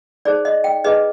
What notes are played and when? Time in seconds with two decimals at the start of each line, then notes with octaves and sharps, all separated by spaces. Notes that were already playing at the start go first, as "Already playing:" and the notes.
0.25 D#4 G#4 C5 D5
0.45 D#5
0.64 G5
0.84 D#4 G#4 B4 D#5